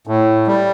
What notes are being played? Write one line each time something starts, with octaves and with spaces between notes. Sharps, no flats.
A2
G3